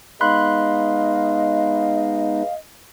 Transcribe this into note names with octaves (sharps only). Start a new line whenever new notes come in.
G#3 B3 D#4 D#5 F5 B5 C6 F#6